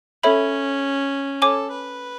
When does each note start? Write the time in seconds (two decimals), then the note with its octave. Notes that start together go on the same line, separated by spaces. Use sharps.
0.23 C#4 A4 C#5 E5 B5
1.42 A4 C#5 G#5 D6
1.71 B4